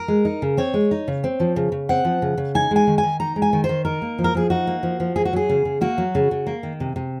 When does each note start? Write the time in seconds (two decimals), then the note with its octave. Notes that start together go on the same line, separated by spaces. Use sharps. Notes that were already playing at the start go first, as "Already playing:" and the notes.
Already playing: A#4
0.08 G#3
0.25 D#4
0.42 C#3
0.57 C4 C#5
0.74 G#3
0.91 D#4
1.08 C#3
1.24 C4
1.40 F3
1.56 C#3
1.72 C#3
1.89 C4 F#5
2.05 F3
2.22 C#3
2.37 C#3
2.55 D#4 G#5
2.71 G#3 G#5
2.87 D#3
2.98 G#5
3.03 D#3
3.20 D#4 A#5
3.36 G#3
3.42 G#5
3.53 D#3
3.64 C5
3.69 D#3
3.85 D#4 A#4
4.02 A#3
4.19 F3
4.24 A#4
4.35 F3 G#4
4.50 D#4 F#4
4.67 A#3
4.83 F3
5.00 F3
5.16 A#3 G#4
5.25 F#4
5.33 F#3 G#4
5.49 C#3
5.65 C#3
5.81 A#3 F#4
5.98 F#3
6.15 C#3
6.31 C#3
6.47 A#3
6.63 D#3
6.80 C3
6.96 C3